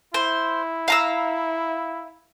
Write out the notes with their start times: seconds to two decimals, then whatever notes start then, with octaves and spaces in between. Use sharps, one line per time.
0.14 E4 C5
0.88 F5 A#5 E6